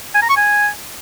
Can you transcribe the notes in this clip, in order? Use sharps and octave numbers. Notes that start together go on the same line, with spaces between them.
G#5
A#5
C#6
G#5